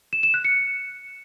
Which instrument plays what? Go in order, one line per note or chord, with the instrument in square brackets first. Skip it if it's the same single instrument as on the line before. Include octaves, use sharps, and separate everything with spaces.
[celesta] E7
E7
F#6
C#7